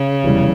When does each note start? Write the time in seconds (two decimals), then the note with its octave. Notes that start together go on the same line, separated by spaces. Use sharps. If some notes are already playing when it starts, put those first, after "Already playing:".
Already playing: C#3
0.24 F1 E2 E3 G3